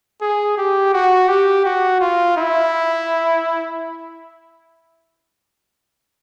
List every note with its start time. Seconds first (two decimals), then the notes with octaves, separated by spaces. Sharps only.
0.22 G#4
0.58 G4
0.93 F#4
1.29 G4
1.65 F#4
2.01 F4
2.37 E4